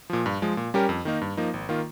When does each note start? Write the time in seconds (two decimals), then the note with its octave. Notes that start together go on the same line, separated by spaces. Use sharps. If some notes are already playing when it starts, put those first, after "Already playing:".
0.10 A#2 F3
0.26 G2
0.42 F3 G#3
0.57 A#2
0.74 G3 C#4 G4 A#4
0.89 F2
1.05 D#3 A#3 D#4
1.21 G2
1.37 F3 A#3 D#4
1.54 G#1
1.69 D#3 A#3 F4